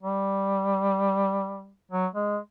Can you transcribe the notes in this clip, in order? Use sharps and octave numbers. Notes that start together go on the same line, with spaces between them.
G3
F#3
G#3